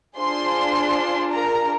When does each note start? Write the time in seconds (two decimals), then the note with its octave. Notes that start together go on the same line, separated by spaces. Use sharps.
0.19 D4 F4 G#4 C5 C6
1.32 A#4 A#5